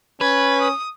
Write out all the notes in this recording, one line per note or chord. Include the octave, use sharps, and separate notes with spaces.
C#4 B4 G#6
D#6